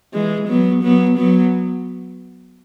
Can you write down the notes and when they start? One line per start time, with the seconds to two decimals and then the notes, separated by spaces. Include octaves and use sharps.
0.13 E3 G#3
0.48 F#3 B3
0.83 F#3 B3
1.17 F#3 B3